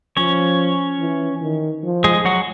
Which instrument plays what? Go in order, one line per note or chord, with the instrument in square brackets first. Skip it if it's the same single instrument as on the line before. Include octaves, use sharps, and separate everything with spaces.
[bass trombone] F3 [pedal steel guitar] C#4 C#5
[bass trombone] E3
D#3
F3
[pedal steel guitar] G#3 G#4
F#3 F#4